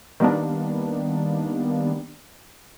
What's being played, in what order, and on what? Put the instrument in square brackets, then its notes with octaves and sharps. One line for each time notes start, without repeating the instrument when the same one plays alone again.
[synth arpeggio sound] D#3 G3 A#3 B3 D4